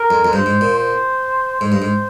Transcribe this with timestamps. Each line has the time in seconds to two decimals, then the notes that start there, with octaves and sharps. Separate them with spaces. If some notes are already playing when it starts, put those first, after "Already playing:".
Already playing: A#4
0.11 F2
0.25 F2
0.32 G2 C5
0.46 G#2
0.61 A#2
0.75 C5
1.61 G#2 C5
1.72 G2
1.82 G#2